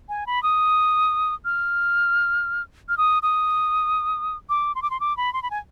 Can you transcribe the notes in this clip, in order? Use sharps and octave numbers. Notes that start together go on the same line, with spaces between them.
G#5
B5
D#6
F6
F6
D#6
D#6
D6
C6
D6
C6
D6
B5
C6
B5
G#5